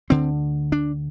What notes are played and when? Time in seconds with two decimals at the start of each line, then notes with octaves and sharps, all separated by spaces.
0.10 D2 D3 C4
0.72 D4